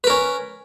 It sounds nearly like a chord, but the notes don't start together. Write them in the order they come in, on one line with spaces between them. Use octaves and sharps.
B4 A#4 C#4